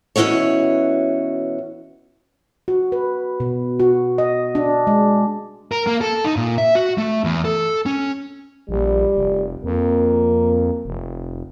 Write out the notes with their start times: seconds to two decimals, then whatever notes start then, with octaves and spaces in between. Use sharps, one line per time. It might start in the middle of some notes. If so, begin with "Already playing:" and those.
0.16 B2 E3 C#4 E4 F#4 C#5
2.68 F#4
2.92 B4
3.40 B2
3.80 F#4
4.18 D#5
4.55 D4
4.87 G#3
5.72 A#4
5.87 A#3
6.01 A4
6.24 D#4
6.36 A#2
6.58 E5
6.75 F#4
6.98 A3
7.24 E2
7.45 A4
7.86 C#4
8.69 A#1 G3
9.16 F1
9.64 F2 A#3
10.85 F1